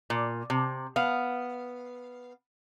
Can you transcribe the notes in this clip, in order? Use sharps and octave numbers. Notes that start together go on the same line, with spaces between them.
A#2
C3
B3 F5